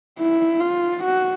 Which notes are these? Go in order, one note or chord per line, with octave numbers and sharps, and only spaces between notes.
E4
F4
F#4